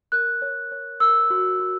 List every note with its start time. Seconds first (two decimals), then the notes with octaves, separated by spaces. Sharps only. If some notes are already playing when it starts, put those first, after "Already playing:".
0.12 A#4 F#6
0.42 C#5
0.72 C#5
1.00 A#4 E6
1.30 F#4
1.60 F#4